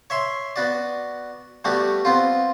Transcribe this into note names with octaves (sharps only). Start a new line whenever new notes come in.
C#5 E5 C6
B3 F#4 D5
G3 A3 B3 F#4 G4
B3 C4 F4